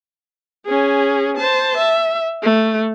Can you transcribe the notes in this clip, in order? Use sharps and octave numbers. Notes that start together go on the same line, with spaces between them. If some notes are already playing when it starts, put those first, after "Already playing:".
C#4 G#4
C5 A5
E5
A3